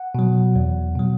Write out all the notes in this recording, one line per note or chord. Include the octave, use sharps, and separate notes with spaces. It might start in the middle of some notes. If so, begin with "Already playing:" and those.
Already playing: F#5
B2 F#3
E2
B2 F#3